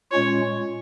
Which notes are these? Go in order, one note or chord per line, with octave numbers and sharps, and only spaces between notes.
A#2 G#3 C#4 F4 C#5